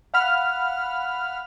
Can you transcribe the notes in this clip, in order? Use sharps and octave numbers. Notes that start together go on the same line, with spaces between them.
F5 F#5 B5 F6